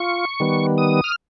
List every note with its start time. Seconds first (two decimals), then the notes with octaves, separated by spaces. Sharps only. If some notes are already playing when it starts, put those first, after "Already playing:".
Already playing: F4 C#6
0.40 D#3 G3 B3
0.78 D#6
1.04 F6